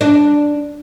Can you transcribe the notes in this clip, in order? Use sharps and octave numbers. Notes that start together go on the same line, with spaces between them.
D4